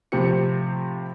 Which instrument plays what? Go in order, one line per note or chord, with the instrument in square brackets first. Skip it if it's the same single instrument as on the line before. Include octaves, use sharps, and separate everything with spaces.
[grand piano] A2 C3 F3 G4 C#7